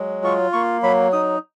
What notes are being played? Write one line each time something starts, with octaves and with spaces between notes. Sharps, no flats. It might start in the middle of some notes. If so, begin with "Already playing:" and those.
Already playing: F#3 G#3
F4 C#6
A#3 C#6
F#3 B5
D#4 D#6